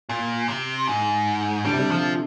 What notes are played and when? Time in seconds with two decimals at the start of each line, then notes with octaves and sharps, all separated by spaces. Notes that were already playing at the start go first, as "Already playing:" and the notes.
0.09 A#2
0.48 C3
0.87 G#2
1.65 D3 G3
1.73 C3
1.79 D3
1.91 F3